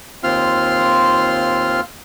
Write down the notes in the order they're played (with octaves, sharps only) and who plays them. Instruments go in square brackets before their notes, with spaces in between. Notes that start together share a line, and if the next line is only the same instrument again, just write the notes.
[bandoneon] D#2 C4 F4 C6 F6